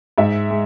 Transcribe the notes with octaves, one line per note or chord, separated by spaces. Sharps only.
G#2 E5
G#3